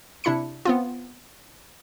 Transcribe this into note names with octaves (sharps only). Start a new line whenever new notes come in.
C3 D4 E4 B5 C#7
B3 C4 F4